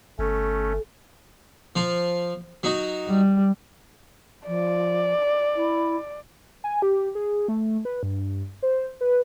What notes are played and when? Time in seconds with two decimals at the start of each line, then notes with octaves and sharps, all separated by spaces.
0.19 G1 A3 C#4 A4
1.76 F3 F4
2.63 F#3 D#4 F#4
3.08 G3
4.47 F3 D5
5.56 E4
6.64 G#5
6.82 G4
7.15 G#4
7.48 A3
7.85 B4
8.03 G2
8.63 C5
9.01 B4